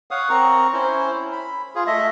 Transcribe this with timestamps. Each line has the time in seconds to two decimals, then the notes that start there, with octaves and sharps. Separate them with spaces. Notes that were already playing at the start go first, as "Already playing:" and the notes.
0.11 C#5 F5 F#5 D#6
0.29 C4 A#4 A#5 C#6
0.73 C#4 E4 C5
1.32 B5
1.75 F4 G#4
1.87 A3 D#5 E5